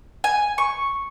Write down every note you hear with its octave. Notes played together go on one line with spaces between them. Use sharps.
G#5
C#6